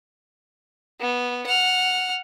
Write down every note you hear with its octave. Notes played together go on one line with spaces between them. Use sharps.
B3
F#5 F6